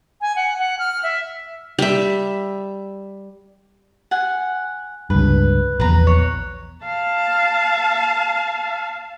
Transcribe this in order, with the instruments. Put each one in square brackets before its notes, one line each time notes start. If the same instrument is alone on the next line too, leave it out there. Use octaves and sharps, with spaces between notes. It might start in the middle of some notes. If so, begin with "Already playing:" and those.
[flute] G#5
F#5
F#5
F6
E5
[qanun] G3 E5
[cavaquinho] F#5 G#5
[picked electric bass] C#2 G2 [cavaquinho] B4
[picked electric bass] A#1 E2 [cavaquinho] B4 A#5
[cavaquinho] C#5
[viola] F5 A5